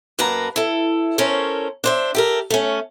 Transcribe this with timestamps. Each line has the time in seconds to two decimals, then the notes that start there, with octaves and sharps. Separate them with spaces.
0.19 F#2 A#3 B4 A5 A#5
0.56 E4 A4
1.18 C#4 A4 A#4 C5 C#5
1.84 D4 C5 E5
2.15 G4 A4 A#4
2.50 A3 C#4